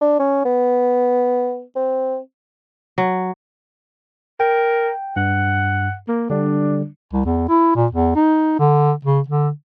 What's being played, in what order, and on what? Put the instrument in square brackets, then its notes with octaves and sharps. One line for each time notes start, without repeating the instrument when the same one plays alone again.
[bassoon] D4
C#4
B3
C4
[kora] F#3
[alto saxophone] A#4 [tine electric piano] G5
[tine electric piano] G2 [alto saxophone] F#5
[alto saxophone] A#3
[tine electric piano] D3 G3 [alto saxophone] D4
[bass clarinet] C2
E2
E4
A#2
E2
D#4
D3
C#3
D3